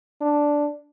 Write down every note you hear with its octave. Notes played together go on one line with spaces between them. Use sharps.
D4